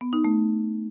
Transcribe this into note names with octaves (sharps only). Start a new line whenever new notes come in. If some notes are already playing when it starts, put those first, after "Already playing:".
B3
D#4
A3